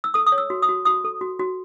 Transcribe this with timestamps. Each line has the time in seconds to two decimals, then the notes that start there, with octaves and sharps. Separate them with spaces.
0.04 E6
0.14 A4 D#6
0.27 D#6
0.32 C#5
0.38 E6
0.50 F#4
0.62 D#6
0.69 F#4
0.85 F#4 D#6
1.04 A4
1.21 F#4
1.39 F#4